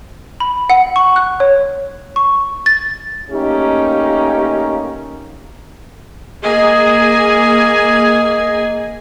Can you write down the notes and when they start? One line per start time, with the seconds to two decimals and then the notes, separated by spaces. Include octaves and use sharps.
0.40 B5
0.70 F#5
0.96 C#6
1.16 F#6
1.40 C#5
2.16 C#6
2.66 A6
3.31 A3 A#3 C#4 D#4 G4
6.45 A#3 G#4 D#5 G#5